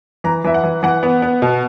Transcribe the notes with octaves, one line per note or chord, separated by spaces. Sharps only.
E3 A#5
E3 E5
F#5
E3
E3 F#5
B3
B3
B2